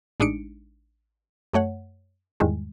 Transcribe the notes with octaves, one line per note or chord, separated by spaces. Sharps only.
A1 G#3 D4 D#4 C#7 D7
F#2 A3 C#5 F#5
E2 G#2 D#3 G3 G#3